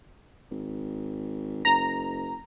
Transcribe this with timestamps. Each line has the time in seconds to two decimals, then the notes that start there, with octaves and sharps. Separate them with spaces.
0.51 G#1
1.65 F#1 A#5